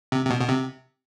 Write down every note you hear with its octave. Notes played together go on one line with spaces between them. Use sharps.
C3
C3
B2
B2
C3